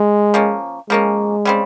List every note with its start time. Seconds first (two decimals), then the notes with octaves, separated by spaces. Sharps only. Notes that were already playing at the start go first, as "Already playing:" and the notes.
Already playing: G#3
0.34 F3 A#3 C#4
0.90 F3 G#3 A#3 C#4
1.45 C#3 G3 C4